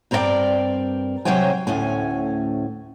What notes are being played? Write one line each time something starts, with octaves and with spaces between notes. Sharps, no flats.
G2 C4 A#4 B4 D5 G5
C3 F#3 C5 C#5 G5 G#5
D2 A2 C#4 G#5